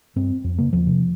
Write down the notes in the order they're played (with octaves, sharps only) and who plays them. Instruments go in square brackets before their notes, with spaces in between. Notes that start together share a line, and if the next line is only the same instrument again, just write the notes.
[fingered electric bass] G2 C4
F2
C#3 A#3
E2 F3
C3